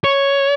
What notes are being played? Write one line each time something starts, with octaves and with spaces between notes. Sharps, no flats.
C#5